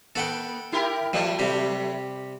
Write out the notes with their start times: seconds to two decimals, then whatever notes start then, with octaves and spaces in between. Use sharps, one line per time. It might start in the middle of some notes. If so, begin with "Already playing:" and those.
0.16 A#3 A4 F#5 G5
0.72 E4 G4 A#4
1.13 F3 F#3 A3 B3
1.39 C3 G3 G4